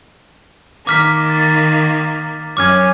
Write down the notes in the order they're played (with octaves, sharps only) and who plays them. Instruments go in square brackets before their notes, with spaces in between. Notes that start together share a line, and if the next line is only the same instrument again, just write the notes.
[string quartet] D#3 A#3 [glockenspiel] D6 F6 B6
[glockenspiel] A6
[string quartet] F#2 C#4 [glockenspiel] D6 F6 G#6